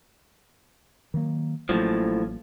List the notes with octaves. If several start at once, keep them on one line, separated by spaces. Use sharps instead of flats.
D#3 F#3 A#3
A1 A2 F3 F#3 A#3